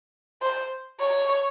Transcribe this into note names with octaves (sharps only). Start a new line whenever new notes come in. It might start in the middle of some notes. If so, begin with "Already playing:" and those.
C5
C#5